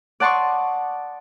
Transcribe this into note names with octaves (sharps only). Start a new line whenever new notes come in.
D5 F#5 A5 C6 C#6 D#6